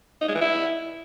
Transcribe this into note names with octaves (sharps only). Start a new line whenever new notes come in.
D#4
G#3
E3
E4